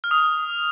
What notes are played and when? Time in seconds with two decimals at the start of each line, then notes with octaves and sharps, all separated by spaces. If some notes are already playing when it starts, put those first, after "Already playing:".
0.04 F6
0.11 D#6
0.18 F7